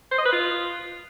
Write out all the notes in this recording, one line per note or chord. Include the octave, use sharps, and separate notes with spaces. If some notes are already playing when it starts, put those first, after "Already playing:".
C5
D#5
B4
F4